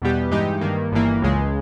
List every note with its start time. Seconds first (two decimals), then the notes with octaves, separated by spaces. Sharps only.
0.02 E2 B2 G3 B3 G4
0.31 G2 E3 G#3 D#4 G4
0.61 G2 D#3 A#3
0.91 G1 G2 E3 A#3
1.22 C#2 C#3 G#3